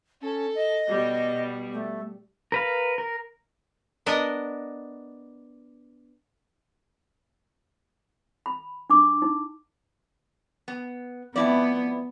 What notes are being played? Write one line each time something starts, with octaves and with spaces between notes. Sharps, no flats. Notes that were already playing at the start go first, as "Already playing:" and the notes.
C#4 A4
D#5
B2 G3
A3
A#4 B4 F5
A#4
B3 D4 A#4 D#5
B5
D4 D6
D#4
B3
F2 B3 E4 D5